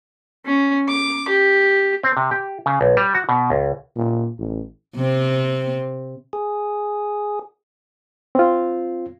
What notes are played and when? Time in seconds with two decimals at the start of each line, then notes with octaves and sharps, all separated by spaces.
0.45 C#4
0.88 D6
1.28 G4
2.03 C4
2.17 C3
2.31 G4
2.66 C#3
2.81 B1
2.97 G3
3.14 F#4
3.29 B2
3.50 C#2
3.96 A#2
4.39 A1
4.96 C3 C4
6.33 G#4
8.35 C4 F4